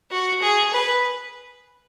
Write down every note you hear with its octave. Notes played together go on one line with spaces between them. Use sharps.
F#4
G#4
B4